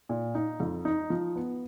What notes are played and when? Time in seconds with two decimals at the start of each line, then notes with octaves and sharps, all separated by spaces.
0.09 A#2
0.35 D#4
0.60 F2
0.85 D#4
1.10 F3
1.36 B3